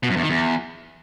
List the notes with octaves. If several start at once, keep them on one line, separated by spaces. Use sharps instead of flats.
B2
F#2
E2
D#3
E2